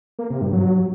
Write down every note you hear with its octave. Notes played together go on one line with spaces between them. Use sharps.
A#3
C3
G2
F#3